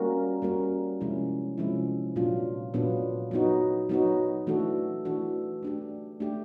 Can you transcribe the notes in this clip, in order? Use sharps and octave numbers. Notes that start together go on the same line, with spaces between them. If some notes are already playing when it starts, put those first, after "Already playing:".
Already playing: G3 A#3 C#4 F#4 A#4
G3 A#3 C#4 F#4 A#4
C3 F3 G#3 C#4 E4
C3 F3 G#3 C#4 E4
A#2 F#3 B3 D4 F4
A#2 F#3 B3 D4 F4
F#3 B3 D#4 F#4
F#3 B3 D#4 F#4
E3 A3 D4 F#4 A4
E3 A3 D4 F#4 A4
A3 D4 G4
A3 D4 G4